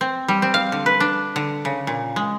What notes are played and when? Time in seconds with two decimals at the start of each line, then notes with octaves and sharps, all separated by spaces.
0.01 C4
0.28 G3
0.42 C4
0.54 F5
0.72 D3
0.86 B4
1.00 D4
1.36 D3
1.65 C#3
1.87 A#2
2.16 G#3